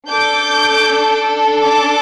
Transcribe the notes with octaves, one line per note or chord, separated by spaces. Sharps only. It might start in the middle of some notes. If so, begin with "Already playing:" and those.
D4 A4 D6 G6
A5 D6